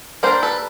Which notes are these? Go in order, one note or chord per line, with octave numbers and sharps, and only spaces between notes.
G3 A#3 D4 A#4 C5
A4 B4